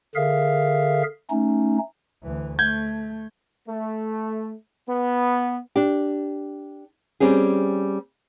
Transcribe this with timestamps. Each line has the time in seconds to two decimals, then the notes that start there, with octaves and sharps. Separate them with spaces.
0.15 D3 G#4 A#4 E5 F5
1.30 A3 C#4 D#4
2.23 D2 E3
2.59 A3 G6 G#6
3.68 A3
4.88 B3
5.76 D4 G4
7.20 G3 C4 C#4 G#4